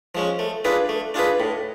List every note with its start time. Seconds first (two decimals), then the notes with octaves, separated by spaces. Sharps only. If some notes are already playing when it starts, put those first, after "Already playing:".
0.15 F3 G#3 C#4
0.39 A3
0.65 D4 F4 G#4 B4
0.89 A3
1.14 D4 F4 G#4 B4
1.40 A2